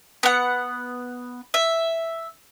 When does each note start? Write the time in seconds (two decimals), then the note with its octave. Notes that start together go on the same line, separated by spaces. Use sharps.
0.23 B3 F#5
1.54 E5